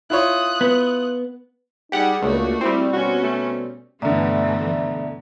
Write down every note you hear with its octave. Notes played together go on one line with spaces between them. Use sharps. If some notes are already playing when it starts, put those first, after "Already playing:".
E4 F4 C#5 D#6 F#6
B3
G3 D#4 G4 G#4 F#5
C#2 A3 A#3 D4 F#4
G3 C4 E4
B2 C#4 F#4
A3
G2 B2 D3 E3 A3 D5 E5 A#5